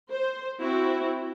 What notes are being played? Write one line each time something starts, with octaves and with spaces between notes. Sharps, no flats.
C5
C4 E4 F#4